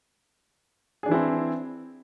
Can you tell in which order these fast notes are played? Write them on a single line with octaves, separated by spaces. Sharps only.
G#4 D4 E3 E4 C4